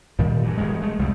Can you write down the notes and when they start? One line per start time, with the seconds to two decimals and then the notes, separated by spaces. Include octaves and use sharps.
0.19 A#2 D#3 F3 G3
0.43 G2 E3
0.57 E1 E2 G2 G#3
0.82 G#3 A3
0.99 F1 C2 F2 G3